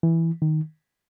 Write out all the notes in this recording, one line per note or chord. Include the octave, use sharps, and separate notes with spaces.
E3
D#3